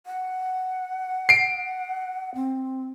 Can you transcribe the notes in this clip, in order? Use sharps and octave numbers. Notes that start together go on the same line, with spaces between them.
F#5
C7 D7
C4